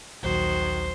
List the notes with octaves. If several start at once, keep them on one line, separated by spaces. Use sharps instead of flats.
A#1 D#2 D#3 F#3 F#4 C5